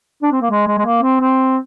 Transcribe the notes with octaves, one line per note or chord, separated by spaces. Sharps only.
D4
C4
A#3
G#3
G#3
G#3
A#3
C4
C4